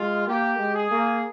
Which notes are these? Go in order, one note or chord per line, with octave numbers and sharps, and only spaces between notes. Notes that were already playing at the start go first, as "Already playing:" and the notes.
Already playing: G#3 F4
A#3 G4
G#3
G#4
A#3